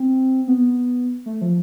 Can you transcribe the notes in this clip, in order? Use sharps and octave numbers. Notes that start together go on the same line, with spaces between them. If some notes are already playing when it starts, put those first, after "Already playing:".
Already playing: C4
B3
A3
F3